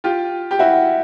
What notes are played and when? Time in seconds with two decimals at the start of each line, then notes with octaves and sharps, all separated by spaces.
0.04 F4 G4
0.51 G4
0.59 E4 F#4